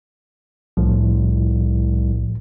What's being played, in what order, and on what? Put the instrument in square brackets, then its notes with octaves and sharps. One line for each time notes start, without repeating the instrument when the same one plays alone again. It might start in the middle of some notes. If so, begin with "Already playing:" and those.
[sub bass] C2 [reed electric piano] A2 F3